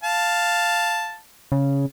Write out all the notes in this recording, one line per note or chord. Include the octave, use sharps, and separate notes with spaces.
F5 A5
C#3